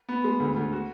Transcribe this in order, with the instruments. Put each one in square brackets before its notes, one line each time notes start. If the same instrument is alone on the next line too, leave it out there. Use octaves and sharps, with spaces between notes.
[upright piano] B3
G#3
D2
D2
F#4